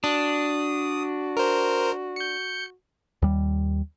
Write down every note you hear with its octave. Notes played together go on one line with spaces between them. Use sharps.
D4 F#4 D#6
A#4 C5
G6 C#7
D#2 G3